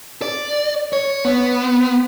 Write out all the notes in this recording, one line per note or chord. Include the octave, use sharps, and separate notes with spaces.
D5
C#5
B3